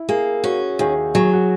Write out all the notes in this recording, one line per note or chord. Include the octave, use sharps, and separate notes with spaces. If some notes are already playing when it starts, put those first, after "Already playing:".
Already playing: E4
A#3 G#4
C#4 F#4
D#2 G#4
F#3 G#4
F#4